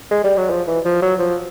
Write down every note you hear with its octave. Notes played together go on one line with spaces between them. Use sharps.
G#3
G3
F#3
F3
E3
F3
F#3
F3